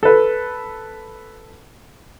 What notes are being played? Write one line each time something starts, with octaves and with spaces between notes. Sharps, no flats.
A4 B4